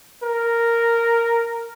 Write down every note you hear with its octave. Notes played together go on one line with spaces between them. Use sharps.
A#4